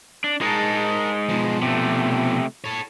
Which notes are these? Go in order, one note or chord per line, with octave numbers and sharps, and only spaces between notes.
D4
G#3 D#4 A#4 A5
B2 F3
C3 A3
A4 C#5